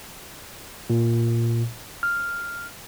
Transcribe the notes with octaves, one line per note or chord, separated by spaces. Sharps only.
A#2
F6